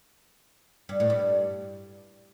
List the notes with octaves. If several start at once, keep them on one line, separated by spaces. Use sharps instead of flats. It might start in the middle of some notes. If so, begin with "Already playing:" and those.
G2
A2
G2